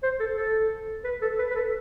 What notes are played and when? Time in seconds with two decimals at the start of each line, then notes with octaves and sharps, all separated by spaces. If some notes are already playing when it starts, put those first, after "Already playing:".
0.03 C5
0.20 A4
0.37 A4
1.04 B4
1.22 A4
1.38 B4
1.50 B4
1.55 A4